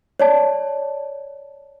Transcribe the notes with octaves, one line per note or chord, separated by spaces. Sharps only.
C#5 D5 A5